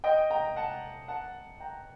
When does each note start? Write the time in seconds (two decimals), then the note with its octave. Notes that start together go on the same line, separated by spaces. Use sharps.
0.04 D#5 G5
0.30 G5 A#5
0.56 F#5 A5
1.08 F#5 A5
1.60 G5 A#5